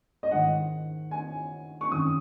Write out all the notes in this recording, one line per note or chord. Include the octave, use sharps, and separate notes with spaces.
D#5
G#2 D#3 F#5
G#5
C#6
F#2 D#3 D#6